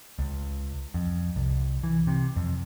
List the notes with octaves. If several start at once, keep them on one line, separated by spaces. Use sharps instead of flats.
C#2
F2
C2
E3
C3
F2